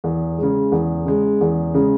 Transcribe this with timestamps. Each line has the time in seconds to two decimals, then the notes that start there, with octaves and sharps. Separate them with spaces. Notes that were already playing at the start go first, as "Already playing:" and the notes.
0.04 E2
0.38 C#3 G#3
0.72 E2
1.06 C#3 G#3
1.41 E2
1.74 C#3 G#3